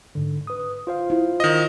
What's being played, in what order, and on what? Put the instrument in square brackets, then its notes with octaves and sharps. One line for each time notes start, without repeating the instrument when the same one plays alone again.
[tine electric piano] G#2 D3
B4 D#6
F4 C5 F5
[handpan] E4
[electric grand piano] D#3 D#5